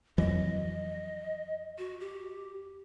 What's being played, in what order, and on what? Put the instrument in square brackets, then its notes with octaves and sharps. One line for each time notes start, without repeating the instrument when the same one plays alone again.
[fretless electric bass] F2 E3 F#3 [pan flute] D#5
[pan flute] F#4
G4